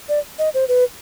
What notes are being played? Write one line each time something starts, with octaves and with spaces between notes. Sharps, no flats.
D5
D#5
C5
B4